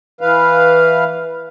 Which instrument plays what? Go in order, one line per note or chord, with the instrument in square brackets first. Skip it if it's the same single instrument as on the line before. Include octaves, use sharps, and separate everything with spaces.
[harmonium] E3 B4 F5